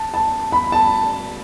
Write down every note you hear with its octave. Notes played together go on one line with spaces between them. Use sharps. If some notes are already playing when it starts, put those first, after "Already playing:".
Already playing: A5
A5
B5
A5